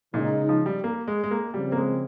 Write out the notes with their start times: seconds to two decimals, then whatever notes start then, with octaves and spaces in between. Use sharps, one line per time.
0.14 A#2 C#3 G#3 D#4
0.49 F3
0.66 G3
0.84 A#3
1.08 G#3
1.24 G#3
1.31 A#3
1.54 C#3 F3 G3 C4
1.72 A#3
1.77 G#3